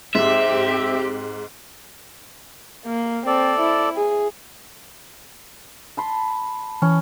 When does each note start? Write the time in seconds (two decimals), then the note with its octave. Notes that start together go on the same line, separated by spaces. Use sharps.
0.15 G#2 C4 G4 E5
2.86 A#3
3.27 C4 A4 D5
3.60 E4
3.96 G#4
5.97 A5 B5 C6
6.82 E3 C#4